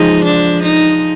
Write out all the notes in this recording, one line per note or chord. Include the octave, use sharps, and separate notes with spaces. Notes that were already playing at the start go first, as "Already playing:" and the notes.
Already playing: F3 G#3 D#4
D4
D#4